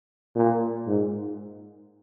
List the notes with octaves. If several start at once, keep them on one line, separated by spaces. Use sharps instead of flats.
A#2
G#2